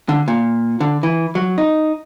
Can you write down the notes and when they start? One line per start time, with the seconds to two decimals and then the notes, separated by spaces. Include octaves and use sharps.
0.09 D3
0.28 A#2
0.80 D3
1.03 E3
1.35 F#3
1.58 D#4